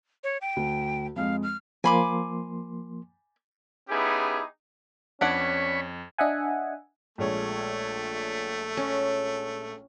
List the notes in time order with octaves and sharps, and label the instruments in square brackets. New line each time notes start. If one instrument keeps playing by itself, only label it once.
[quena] C#5
G5
[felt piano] D2
[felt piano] F2 G#3 [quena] F5
[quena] F6
[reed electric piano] F3 A#3 C6 [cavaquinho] G#5 B5 D6
[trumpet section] B3 C#4 D#4 E4 G4 G#4
[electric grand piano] F2 G#6 [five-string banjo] B3 D4 F#5 [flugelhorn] C#4 [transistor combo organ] B5 C#6
[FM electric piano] D4 D#5 E5 F#5 G#5
[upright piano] A#1 G#3 C#5 [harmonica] A3
[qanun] C#4